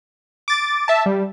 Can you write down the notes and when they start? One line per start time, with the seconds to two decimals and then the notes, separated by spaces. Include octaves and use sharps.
0.48 D6 A6
0.88 E5 A5
1.06 G3